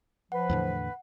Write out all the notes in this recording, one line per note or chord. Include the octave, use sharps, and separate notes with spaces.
F3 B4 F#5
E2 A2 D3